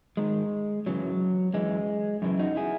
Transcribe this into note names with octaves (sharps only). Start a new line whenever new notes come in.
G#2 D#3 G#3
F#2 C#3 E3 F#3
F#2 E3 G#3
F#2 C#3 E3
D#4 F#4
E4 G#4